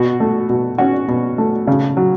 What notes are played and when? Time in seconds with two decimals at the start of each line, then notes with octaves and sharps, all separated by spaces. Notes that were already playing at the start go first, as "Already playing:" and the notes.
Already playing: B2 F#4
0.20 A3
0.49 B2
0.78 C#4 F#4
1.08 B2
1.38 A3
1.67 C#3
1.97 F#3